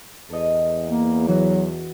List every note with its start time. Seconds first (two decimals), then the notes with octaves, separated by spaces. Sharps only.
0.29 E2 A4 D#5
0.86 A#3
1.28 E3 F#3 F#4